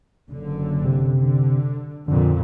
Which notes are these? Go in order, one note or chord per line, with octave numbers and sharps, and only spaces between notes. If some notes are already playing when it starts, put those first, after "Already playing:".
F#1 D3
C3
D3
F2 A#2 D3